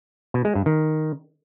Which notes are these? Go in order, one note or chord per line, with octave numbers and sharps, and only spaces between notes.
B2
G#3
G2
D#3